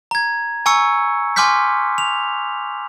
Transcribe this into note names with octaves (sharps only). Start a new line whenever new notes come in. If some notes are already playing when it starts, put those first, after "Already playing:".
A#5 G#6
G#5 A#5 C#6 E6 C#7
G#5 C6 D6 F6 G6 B6
F7